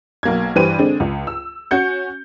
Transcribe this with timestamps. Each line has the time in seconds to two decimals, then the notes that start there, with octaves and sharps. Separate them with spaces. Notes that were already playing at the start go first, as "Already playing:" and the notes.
0.23 B1 A#3 G#6
0.55 G2 E3 G4 B4 C5 D#7
0.79 D3 G#3 C4 D4
1.00 C#2
1.27 E6
1.71 C#4 F#4 G6 C#7